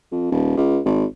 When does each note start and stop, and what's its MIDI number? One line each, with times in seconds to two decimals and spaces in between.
0.12 0.26 41
0.32 0.52 27
0.57 0.79 37
0.86 1.05 32